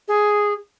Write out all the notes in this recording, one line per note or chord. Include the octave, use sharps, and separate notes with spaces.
G#4